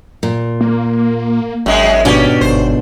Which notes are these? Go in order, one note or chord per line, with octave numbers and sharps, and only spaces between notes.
A#2
A#3
G#1 F#2 G#3 G5
G#2 B2 C#4 D4 G4
G1 C5